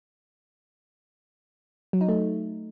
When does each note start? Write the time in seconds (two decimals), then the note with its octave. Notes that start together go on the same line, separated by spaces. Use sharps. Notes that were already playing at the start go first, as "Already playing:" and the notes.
1.93 F#3
2.01 D#4
2.08 A3